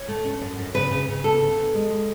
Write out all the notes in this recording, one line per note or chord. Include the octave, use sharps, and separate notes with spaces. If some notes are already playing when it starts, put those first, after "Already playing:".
Already playing: C#5
A3
C#4
F#2
F#2
C#3 B4
C#3
C#3
B3 A4
D3
B3
G#3
G#3